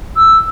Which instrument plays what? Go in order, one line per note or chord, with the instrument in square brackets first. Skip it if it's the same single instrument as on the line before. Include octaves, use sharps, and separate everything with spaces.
[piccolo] E6